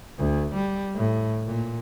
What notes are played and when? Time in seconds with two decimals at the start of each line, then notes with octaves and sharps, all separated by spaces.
0.18 D2
0.54 G3
0.94 A2
1.46 A#2